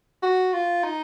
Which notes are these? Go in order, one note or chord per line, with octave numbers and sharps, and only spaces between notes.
F#4
F4
D#4